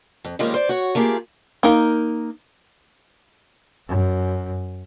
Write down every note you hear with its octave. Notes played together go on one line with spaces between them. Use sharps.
F2
D#3 F3 G3 G#3 A#3 C#4
C5 D5
F#4 C#5
A3 A#3 F4 G4 G#4
A#3 D#4 A#4
F#2